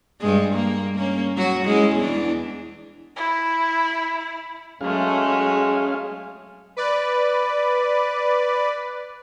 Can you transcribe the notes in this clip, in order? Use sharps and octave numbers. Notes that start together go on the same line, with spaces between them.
G2 G#3
A#3
A#3 C#4
F#3 F#4
G#3 C#4 E4
E2 E3 D4
E4
F#3 G#3 A3 C#4 G#4 F5
B4 D5